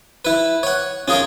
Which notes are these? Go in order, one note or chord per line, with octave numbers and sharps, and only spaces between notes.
E4 B4
C#5 F#5
C#4 F4 G#4 A#4 F5